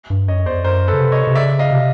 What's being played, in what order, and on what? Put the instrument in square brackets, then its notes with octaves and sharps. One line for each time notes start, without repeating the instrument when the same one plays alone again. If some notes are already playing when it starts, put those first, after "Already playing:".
[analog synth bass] G2
[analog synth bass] F#2 [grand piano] C#5 D#5
[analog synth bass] E2 [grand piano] C5 D5
[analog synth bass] F2
[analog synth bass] F#2 [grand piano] A#4 C5
[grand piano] A4 B4
[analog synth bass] C#3
C3
[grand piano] C#5 D#5
[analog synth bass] C3
[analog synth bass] C#3 [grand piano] D5 E5
[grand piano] D#5 F5
[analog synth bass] C3